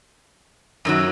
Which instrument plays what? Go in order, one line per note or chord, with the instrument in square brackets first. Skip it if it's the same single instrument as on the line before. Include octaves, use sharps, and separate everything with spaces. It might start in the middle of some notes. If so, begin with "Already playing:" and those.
[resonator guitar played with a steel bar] F#2 D#3 F#3